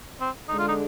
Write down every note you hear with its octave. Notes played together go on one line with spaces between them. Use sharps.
C4
D3 G#3 D4 D#4
F4
D#4